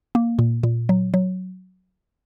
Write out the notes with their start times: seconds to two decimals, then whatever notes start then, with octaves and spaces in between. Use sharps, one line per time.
0.15 A#3
0.39 A#2
0.63 A#2
0.89 F#3
1.14 F#3